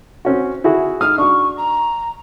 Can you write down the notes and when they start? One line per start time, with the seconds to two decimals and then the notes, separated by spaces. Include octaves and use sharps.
0.25 C4 C#4 F#4
0.64 E4 F#4 G#4
1.00 G#2 D#6 F6
1.18 D4 F#4 C#6
1.57 A#5